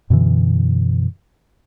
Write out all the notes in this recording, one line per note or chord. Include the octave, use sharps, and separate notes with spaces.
F#2 B2 D3 E3